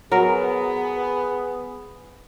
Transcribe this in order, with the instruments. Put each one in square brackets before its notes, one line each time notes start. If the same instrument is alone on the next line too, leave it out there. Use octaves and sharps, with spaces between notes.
[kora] F#3 A#4 [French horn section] B3 G#4